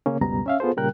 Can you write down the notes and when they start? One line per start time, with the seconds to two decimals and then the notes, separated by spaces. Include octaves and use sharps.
0.06 C#3 A#3 C#4
0.21 C#2 F#2 B2 G3 B3 A#5
0.46 C#4 E5 F5
0.60 B3 F4 G#4 A4 C5
0.77 A#2 C#3 G3 A#4 G5 F#6